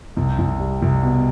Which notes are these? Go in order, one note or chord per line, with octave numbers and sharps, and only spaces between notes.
C2
C2
G3
C2
B2